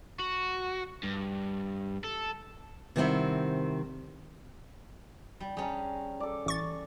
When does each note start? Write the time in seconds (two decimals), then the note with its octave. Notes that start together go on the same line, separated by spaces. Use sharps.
0.20 F#4
1.03 G2
2.04 A4
2.96 C3 D#3 G3 C4 E4 F#5
5.40 G3
5.57 G3 C#4 G#4 A5 A#5
6.20 A4 D5
6.46 A1 C#6 A6